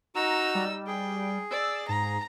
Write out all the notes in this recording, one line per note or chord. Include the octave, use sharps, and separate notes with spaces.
D#4 F#4 A#5 E6
G3
G#4 G5
D5 E6
G#2 A#5